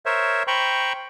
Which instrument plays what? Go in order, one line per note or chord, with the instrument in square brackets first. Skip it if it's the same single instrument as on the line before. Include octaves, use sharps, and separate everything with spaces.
[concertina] A#4 C5 C#5 E5
C5 G5 A#5 B5 C#6